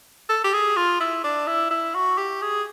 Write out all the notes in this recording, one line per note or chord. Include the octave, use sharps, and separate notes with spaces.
A4
G4
G#4
F4
E4
D4
E4
E4
F#4
G4
G#4